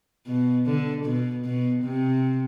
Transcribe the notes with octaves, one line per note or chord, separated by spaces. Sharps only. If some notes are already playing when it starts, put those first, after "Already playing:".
B2
D3
B2
B2
C3